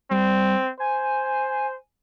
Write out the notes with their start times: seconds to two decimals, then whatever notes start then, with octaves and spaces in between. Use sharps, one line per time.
0.11 G3 C4
0.80 C5 G#5